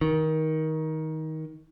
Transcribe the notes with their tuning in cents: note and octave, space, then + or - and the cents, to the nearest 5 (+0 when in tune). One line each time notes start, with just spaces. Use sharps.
D#3 +20